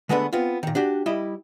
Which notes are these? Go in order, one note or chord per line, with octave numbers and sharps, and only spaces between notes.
D3 G#3 A3 B3 D4 B4
B3 C4 F4
A#2 D#3
D4 F#4 G4
G3 E4 G4 D#5